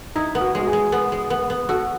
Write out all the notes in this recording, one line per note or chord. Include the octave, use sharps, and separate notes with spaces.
D#4 E4
B3
F#4
G#3 F#4
G#4
G#3
B3
G#3
B3
B3
F#4 A4